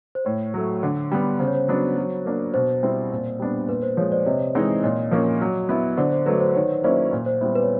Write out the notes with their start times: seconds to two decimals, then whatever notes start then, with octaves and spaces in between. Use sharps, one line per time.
0.15 C5
0.25 A2 C#5
0.54 F#3 A3
0.83 D3
1.12 G3 B3
1.39 C#3 C5
1.47 C#5
1.55 C5
1.68 F#3 B3 D4
1.97 F#3
2.26 A#3 D4
2.54 B2 C5
2.83 G3 C4 E4
3.12 A#2
3.40 G3 B3 D4
3.69 A#2 B4
3.83 C5
3.97 F3 G#3 C#5
4.12 C5 D5
4.26 C3 C#5 D#5
4.55 E3 G#3 C4 D#4
4.83 A#2 C#5 D#5
5.11 F3 A#3 C#4
5.41 F#3
5.69 B3 E4
5.97 D3 C5 D5
6.12 C5
6.26 F#3 A3 B4
6.40 C5
6.56 D#3 C#5
6.84 F#3 A#3 C#4 E4 C5 D5
7.12 A#2
7.26 C5
7.41 G3 B3 E4 C5
7.55 B4
7.63 C#5